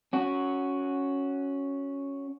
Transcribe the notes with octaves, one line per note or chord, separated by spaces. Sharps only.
C#4 F#4